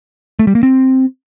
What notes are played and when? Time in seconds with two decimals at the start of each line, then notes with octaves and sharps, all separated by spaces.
0.39 A3
0.47 G3
0.55 A#3
0.63 C4